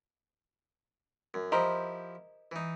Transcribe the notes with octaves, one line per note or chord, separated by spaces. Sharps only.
F#2
F3 E4 G4 A#4 C5 D#5
E3 D#4